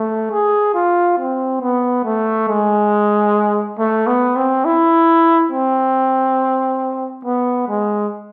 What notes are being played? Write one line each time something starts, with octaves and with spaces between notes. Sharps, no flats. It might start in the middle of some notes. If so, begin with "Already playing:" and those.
Already playing: A3
G#4
F4
C4
B3
A3
G#3
A3
B3
C4
E4
C4
B3
G#3